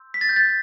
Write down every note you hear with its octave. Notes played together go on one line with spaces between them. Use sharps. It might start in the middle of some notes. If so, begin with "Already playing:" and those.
Already playing: C6 E6 G6
B6
A6
G6
A6